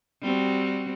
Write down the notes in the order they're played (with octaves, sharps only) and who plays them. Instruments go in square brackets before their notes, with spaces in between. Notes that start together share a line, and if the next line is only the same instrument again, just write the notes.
[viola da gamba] G3 C4 F#4